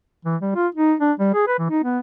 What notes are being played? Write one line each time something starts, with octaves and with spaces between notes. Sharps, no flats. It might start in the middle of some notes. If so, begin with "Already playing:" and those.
E3
G3
F4
D#4
D4
G3
G#4
B4
E3
D#4
B3